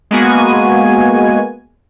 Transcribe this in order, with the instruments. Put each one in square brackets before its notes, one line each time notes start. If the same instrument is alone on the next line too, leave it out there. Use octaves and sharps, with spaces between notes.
[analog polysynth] G#3 A#3 B3 F#4 G#5